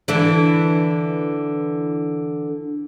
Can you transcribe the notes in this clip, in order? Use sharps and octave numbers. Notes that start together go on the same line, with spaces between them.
D3 E3 D4